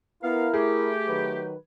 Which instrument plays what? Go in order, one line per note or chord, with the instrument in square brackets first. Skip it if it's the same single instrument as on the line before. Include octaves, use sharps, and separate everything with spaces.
[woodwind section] B3 F5 [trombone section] E4 A#4
[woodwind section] A3 G4 [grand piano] G#4
[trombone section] D#3 F#3 B4